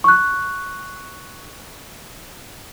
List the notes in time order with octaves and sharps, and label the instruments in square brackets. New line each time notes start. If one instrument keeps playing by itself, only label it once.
[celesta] C#6 F#6